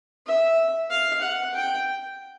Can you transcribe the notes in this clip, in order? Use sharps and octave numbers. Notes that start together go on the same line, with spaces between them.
E5
F5
F#5
G5